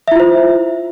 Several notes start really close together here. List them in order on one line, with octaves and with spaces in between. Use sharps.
E5 E4 F4 C5